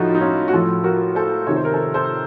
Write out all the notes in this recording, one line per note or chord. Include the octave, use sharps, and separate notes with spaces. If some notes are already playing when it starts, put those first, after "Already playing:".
Already playing: A2 F3 D#4 F4 F#4 A4
D#4
C#4 F4
F#4
A2 F3 F4 A4
F#4 A#4
A4 C5
C3 D#3 C#5
C5
A#4
A4 C5
A4 C5